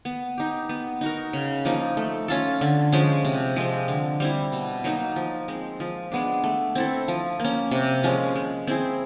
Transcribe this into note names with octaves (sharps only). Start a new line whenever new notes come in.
B3
D#4 G4
B3
D#4 F#4 A#4
C#3
F3 A#3 D#4
A3
C#4 F4 A4
D3
F3 G#3 C#4
C3
F3 G#3 C4
D3
G3 C4 E4
B2
F#3 A#3 D#4
F3
G#3 C4
F3
G#3 B3 D4
A3
C4 E4 A4
F3
A#3 C#4
C3
F3 G#3 C#4
G#3
C4 E4 G#4